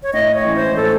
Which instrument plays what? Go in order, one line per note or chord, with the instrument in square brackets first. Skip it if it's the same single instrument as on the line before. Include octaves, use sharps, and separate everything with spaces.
[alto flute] C#5
[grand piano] A2 [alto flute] D#5
[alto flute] C#5
[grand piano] E3 G#3 C#4
[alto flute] C5
[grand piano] A2 [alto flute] A4